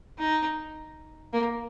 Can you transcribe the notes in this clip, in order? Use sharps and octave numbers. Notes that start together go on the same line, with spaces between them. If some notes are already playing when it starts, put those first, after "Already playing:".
D#4
A#3